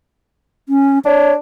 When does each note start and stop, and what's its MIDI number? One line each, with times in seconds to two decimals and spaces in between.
0.69 0.99 61
1.05 1.37 62
1.05 1.32 73